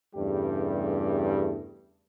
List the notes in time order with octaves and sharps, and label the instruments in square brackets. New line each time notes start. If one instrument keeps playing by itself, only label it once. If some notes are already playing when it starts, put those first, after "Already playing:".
[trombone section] E2 G2 C#3 G3 A3 G4